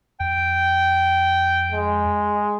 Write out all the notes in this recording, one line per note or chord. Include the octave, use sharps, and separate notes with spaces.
F2 G5
G#3